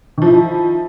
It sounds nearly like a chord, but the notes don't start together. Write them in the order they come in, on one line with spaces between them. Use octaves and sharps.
D#3 F3 E4